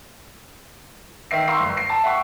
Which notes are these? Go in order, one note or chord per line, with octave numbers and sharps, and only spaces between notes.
D#3 E5 C7
F5 A#5 C6 C#6 E6 C7
G1
C7
A5
E5 F#5 G5 C#6